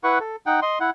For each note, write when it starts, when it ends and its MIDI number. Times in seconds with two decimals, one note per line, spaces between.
0.04 0.19 64
0.04 0.19 71
0.04 0.19 78
0.04 0.19 85
0.20 0.36 69
0.46 0.60 63
0.46 0.60 78
0.46 0.60 79
0.62 0.79 75
0.62 0.79 84
0.80 0.90 64
0.80 0.90 78